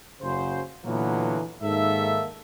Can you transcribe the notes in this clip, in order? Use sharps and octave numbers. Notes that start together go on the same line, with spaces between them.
F#1 C#3 F#4 C5
A#2 D3 E3 F#3 A#3 B3
G#2 D#3 A#3 A4 E5